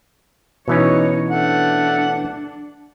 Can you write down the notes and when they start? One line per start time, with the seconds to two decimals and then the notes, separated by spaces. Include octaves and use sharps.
0.68 B2 E3 C#4 D#4 C#5
1.29 A3 D4 F#5